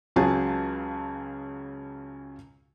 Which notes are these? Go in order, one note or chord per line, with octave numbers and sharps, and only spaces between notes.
C#2 C#3 F#3 G#4 A5